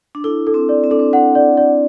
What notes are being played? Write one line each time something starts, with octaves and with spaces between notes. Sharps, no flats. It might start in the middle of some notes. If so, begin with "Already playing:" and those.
D4
E4 A4
A4
C4
D5
C4
D4 A4
C4
D4 F#5
D5
D5